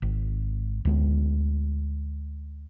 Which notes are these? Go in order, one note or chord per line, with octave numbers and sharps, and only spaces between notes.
G#1
D2 G#3 B3